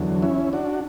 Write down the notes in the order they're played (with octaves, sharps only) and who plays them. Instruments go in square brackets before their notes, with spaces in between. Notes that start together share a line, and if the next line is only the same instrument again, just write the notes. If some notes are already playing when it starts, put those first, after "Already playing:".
Already playing: [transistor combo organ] E2 D3 F#3
C#4 E4
D4 F#4